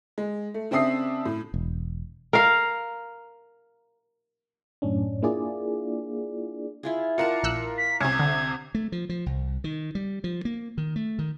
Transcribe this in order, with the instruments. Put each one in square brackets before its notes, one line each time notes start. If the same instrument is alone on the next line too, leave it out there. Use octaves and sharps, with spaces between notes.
[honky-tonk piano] G#3
A3
C#3 C4 D4 E5 D#6 C7
A2
[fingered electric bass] E1
[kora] A#4 F5
[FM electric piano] F#2 A2 C#4 D4
A#3 D4 E4 F4 G#4 D5
[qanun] E4 F4 G#4
[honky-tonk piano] F4 A#4 [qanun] D5 F#5 A5 [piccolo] C#7
[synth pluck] A#1 E6 F#6
[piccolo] B6
[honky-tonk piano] C2 C3 [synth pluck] C#4 [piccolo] G#6
[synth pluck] D3
[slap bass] A3
F3
F3
C2
D#3
G3
F3
A#3
D#3
A3
D#3